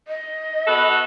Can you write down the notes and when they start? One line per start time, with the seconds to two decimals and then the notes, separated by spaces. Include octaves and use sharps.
0.08 D#5
0.67 B3 F#4 A4